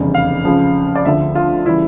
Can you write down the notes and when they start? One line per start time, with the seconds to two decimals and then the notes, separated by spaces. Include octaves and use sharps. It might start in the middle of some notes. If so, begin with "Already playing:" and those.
Already playing: F1 E2 C#3 G3
0.14 F5
0.44 C#2 C#3 F3
0.96 D5
1.05 D2 D3 F3 E5
1.35 F4
1.66 C#3 E3 G3 E4